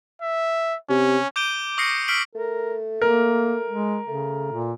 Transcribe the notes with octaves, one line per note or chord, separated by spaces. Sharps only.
E5
C3 C#4
D6 G6 D7 D#7 G7
C#6 D#6 F6 A#6 C7 C#7
E6 F6 B6 C7 D7 F#7
A3 A#4
A#3 A#4
G#3
C#3 A3
A#2